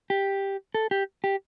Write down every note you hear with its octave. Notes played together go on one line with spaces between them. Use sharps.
G4
A4
G4
G4